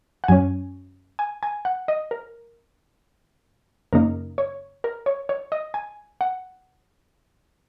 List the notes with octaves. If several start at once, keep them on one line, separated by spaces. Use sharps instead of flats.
F#5
F#2 F#3 C#4 G#5
G#5
G#5
F#5
D#5
A#4
F#2 C#3 A#3 D#4 A#4
C#5
A#4
C#5
C#5
D#5
G#5
F#5